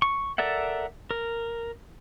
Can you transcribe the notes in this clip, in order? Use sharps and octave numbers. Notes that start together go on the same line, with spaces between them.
C#6
A4 A#4 D5 E5 F#5
A#4